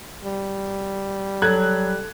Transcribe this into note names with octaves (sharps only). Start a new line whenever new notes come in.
G3
F#3 A4 F#6 G#6